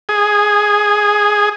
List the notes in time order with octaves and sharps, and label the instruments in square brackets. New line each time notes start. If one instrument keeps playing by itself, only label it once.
[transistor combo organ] G#4